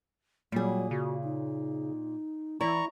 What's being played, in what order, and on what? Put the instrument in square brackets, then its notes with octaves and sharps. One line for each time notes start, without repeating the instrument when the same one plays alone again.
[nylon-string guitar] A#2 G#4 [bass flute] F#3 [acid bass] G3
[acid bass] C#3 [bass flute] F#4
[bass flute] D#4
[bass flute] E3 [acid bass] E4 [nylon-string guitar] D5 [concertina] A#5 C#6